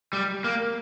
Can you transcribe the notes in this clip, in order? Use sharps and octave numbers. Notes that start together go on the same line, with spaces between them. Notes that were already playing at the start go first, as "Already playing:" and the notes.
G3
A#3